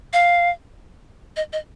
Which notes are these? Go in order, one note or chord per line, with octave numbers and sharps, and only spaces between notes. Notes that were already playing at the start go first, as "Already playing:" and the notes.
F5
D#5
D#5